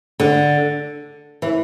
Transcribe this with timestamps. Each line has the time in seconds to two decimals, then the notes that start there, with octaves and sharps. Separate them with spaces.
0.20 D3
1.42 E3